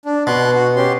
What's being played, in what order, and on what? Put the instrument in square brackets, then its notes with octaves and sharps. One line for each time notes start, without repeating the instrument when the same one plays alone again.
[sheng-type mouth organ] D4
[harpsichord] B2 [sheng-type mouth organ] C6 F#6
[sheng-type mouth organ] F#4
C#4 G4 C6